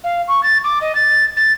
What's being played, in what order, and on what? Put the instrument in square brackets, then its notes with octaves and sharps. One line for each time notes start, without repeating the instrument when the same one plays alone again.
[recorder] F5
C#6
A6
D6
D#5
A6
A6